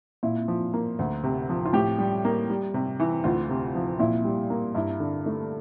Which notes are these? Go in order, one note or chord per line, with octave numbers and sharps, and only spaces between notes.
A#2 E4
F3
A#3
D2
C3
F3
F4
A2 G4
G3
A#3
G3
C3
E3
D2 F4
C3
F3
A#2 E4
G3
A#3
G2 E4
D3
A3